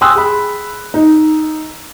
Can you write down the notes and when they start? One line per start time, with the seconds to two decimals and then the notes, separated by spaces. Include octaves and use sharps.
0.01 G5 G#5 C6 D#6 E6 F#6
0.15 G#4 B5
0.94 D#4